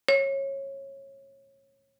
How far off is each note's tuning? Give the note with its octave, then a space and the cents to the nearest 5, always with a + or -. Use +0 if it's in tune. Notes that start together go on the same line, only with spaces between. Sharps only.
C#5 -20